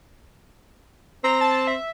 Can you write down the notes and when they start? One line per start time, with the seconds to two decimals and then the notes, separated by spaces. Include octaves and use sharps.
1.24 C4 A#5
1.41 A5
1.67 E5